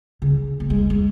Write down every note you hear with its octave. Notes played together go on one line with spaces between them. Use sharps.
C#3
A#3
G#3
G#3